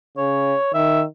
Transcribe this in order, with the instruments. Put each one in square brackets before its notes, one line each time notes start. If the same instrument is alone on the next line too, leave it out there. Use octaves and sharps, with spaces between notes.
[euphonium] C#3 [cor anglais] C#5
[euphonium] D#3 [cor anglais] E5